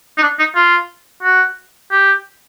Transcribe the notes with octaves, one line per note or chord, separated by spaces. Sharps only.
D#4
D4
D#4
F4
F#4
G4